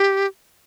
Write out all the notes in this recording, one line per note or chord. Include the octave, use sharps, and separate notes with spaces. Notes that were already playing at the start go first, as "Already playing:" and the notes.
Already playing: G4